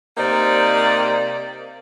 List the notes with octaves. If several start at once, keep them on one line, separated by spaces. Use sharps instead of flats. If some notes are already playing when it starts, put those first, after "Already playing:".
C3 A#3 D#4 G4 C5 D5